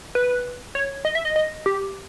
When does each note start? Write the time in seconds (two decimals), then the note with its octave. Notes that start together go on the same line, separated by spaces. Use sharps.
0.15 B4
0.75 C#5
1.05 D#5
1.15 E5
1.25 D#5
1.36 D#5
1.66 G4